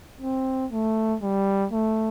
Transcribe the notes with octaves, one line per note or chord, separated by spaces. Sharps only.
C4
A3
G3
A3